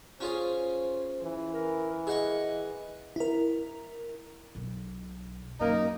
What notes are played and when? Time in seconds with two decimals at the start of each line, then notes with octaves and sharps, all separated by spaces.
0.21 C#4 F4 G#4 C5
1.22 E3
1.54 A#4
2.07 G#4 D#5 F#5 C#6
3.16 E4 A#4
4.55 B1
5.60 F#2 A#3 C4 D4 D#4 A#4